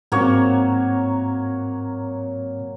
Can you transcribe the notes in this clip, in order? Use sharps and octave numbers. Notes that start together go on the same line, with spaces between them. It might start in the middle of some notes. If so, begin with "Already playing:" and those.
G#2 F#3 A#3 C4 C#5